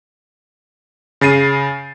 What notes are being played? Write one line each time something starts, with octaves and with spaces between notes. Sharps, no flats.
C#3 A6 C7 D#7